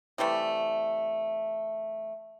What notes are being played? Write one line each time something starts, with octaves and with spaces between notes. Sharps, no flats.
C3 E3 G3 A3